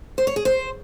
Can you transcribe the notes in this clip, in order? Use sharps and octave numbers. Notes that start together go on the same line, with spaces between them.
C5
C#5
G#4
C5